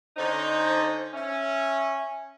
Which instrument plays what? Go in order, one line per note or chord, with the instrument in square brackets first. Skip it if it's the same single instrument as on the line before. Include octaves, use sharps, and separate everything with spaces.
[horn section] D3 C#4 D#4 [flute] C5
[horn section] C#4 [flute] E5